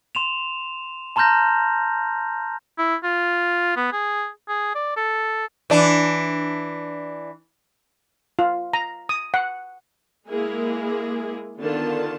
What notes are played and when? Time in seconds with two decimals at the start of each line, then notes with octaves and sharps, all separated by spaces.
0.15 C6 E7 F7
1.16 A5 A#5 C6 F6 G6 A#6
2.78 E4
3.04 F4
3.77 B3
3.92 G#4
4.48 G#4
4.75 D5
4.97 A4
5.70 E3 D4
8.39 F4
8.73 A#5
9.09 D#6
9.34 F#5
10.27 G#3 A#3 E4 G#4
11.59 D3 D#3 B3 F4 A5